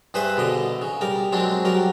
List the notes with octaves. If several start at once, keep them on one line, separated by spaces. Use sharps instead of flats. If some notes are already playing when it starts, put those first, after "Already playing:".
G2 G#4 B4 C5 E5 D#6
B2 D3 D#5
C#3
G3 A#4
F#3 G#3 C4 D4
F#3 G3 A#4